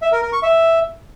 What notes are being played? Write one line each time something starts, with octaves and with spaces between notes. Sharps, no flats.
E5
A#4
A#4
C#6
E5